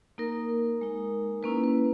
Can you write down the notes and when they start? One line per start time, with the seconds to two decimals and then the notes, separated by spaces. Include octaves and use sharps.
0.18 A#3 D#4 A#4
0.81 G#3 D#4
1.43 A#3 C#4 E4 B4
1.64 B4